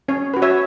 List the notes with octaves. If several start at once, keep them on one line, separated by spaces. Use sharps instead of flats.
C#4 C#5
F#4 B4
C#5 E5